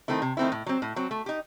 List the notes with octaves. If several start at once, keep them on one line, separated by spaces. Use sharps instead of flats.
D#3 A3 C4 E4
C3
D#3 A3 C4 E4
A2
F#3 C4
A2
F#3 C4
A3
D#4 G4